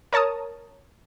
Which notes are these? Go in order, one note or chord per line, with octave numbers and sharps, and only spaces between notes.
A#4 C#5 A5 A#5 D#6